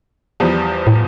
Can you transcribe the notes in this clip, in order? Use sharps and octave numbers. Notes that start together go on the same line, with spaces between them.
E2 F3 G3
A2